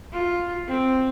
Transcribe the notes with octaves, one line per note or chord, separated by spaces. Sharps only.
F4
C4